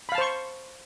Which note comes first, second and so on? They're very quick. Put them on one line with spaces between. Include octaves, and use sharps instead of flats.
B5 F5 A5 C5 C#6